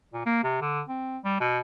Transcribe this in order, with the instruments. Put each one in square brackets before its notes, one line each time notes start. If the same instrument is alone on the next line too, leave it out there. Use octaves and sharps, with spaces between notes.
[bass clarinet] A#2
A#3
C3
D3
C4
G3
B2